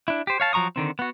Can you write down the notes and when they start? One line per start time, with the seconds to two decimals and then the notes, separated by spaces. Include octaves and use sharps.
0.08 D4 E4
0.27 G4 C5
0.40 C#5 F5 A5
0.53 F3 F#3 A#5 C#6 D#6
0.76 D3 D#3 C4
0.99 B3 F#4